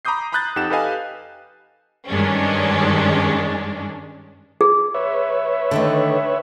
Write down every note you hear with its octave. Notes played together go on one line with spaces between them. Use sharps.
A#5 B5 D6 D#6 G6 C7
A#5 B5 D#6 F#6 G6 A6
F2 D#4 G4 F#5 E7
G4 A4 B4 D#5 F5 G#5
G2 D#3 G#3 C#4 D4
G#4
B4 C#5 E5
D3 D#3 A3